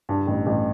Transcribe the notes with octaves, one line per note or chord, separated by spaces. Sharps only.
G2
A1
A1